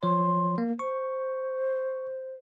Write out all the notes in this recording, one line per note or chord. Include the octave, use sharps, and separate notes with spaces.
F3 C#5 C6
A#3
C5 C#6